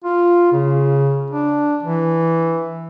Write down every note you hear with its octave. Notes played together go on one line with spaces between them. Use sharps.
F4
C#3
D4
E3